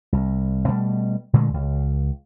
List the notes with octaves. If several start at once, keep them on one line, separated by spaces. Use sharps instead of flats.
C2
B2 G3 A3
A#2 D3 G#3 A3
C#2